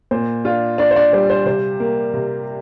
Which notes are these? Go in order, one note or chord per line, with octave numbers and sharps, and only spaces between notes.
A#2 C5
D4 F4 F5
D4 D5
C5
D4 D5
G3 C5
C5
C3 C5
A#3
C3